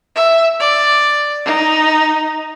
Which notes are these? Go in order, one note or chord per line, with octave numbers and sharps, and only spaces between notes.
E5
D5
D#4